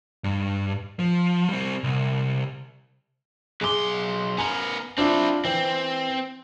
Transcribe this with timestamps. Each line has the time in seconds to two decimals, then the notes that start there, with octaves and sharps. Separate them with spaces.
0.24 G2
0.99 F3
1.49 G3 C4
1.84 C2
3.61 B1 G#4 C6 D6
4.38 B3 A#4 G#5
4.98 C4 D4 E4 F4
5.45 E3 C4